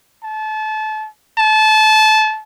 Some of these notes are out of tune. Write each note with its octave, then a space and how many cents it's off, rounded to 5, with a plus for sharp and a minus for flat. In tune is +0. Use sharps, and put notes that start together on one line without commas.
A5 -30
A5 -25